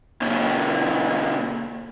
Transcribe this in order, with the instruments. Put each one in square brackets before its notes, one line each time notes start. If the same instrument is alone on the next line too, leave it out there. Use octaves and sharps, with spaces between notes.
[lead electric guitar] A#2 C#3